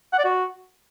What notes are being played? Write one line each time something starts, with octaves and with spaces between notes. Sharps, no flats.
F#5
D5
F#4